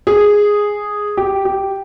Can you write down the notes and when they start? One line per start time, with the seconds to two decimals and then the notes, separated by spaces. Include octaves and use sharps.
0.07 G#4
1.17 G4
1.45 G4